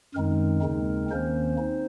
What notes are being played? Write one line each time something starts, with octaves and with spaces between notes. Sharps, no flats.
F#2 D#3 G#3 C4 D#4 A#4
D#2 C#3 G#3 C4 D#4
D#2 D#3 A#3 C4 C#4 C5
D#4